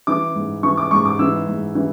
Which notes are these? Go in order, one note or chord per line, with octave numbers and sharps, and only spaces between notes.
E3 D6
G#2
E3 C#6
D6
G#2 C#6
D6
E3 E6
G#2
E3